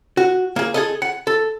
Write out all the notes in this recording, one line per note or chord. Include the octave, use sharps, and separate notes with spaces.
F#4
A#3 G#4
G#4 A4 D#5
F#5
A4